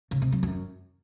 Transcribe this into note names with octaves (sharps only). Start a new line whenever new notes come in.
C#3
C3
F#3
F#2